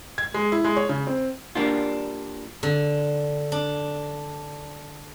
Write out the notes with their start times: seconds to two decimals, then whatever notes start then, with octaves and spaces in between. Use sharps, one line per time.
0.18 G#6
0.34 G#3
0.52 E4
0.65 G#3
0.77 C#5
0.89 C#3
1.07 C4
1.55 G3 A#3 D4 F4
2.63 D3
3.52 D4